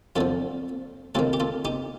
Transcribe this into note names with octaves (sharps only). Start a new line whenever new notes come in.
F2 D3 F3 F4 A4
D2 C3 D#3 F4 A4
G4
F4 A4
D#4 G4